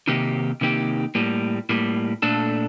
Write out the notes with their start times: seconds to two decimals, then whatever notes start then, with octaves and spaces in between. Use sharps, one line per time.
0.07 C3 D#3 A#3 D#4 G4
0.61 C3 D#3 A#3 D#4 G4
1.15 A2 G3 A#3
1.69 A2 G3 A#3
2.22 A#2 A3 D4 A4